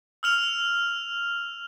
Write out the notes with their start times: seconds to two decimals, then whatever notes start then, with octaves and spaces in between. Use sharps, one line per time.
0.23 E6 F6 F7